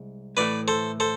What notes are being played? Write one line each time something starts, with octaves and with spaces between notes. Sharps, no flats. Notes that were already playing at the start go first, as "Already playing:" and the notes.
Already playing: C2 G#3
A2 E3 A3 E4 B4 D5
A4 C5
A4 C5